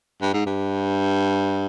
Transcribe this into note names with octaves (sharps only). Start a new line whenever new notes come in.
G2
G#2
G2